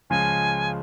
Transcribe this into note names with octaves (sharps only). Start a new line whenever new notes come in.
C#2 C#3 F3 G#3 G#5